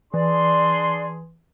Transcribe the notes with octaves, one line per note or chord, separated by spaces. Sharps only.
E3 D4 G#4 D5 C6